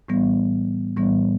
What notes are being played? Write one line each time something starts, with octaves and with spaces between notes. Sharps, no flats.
A2 E3 G3 B3
A2 E3 G3 B3